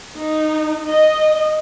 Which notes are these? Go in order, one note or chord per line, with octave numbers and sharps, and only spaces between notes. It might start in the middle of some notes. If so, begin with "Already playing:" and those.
D#4
D#5